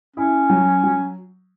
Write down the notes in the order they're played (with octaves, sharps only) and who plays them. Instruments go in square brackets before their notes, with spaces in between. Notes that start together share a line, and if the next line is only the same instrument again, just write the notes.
[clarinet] C#4 [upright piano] E4
[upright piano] F#3
F#3